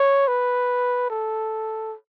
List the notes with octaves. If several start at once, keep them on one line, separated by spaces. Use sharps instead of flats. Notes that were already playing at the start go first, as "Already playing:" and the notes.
Already playing: C#5
B4
A4